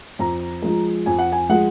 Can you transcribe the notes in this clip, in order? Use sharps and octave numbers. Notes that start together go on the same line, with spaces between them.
F2 A#5
F3 G#3
F2 G#5
F#5
G#5
F3 G#3 F#5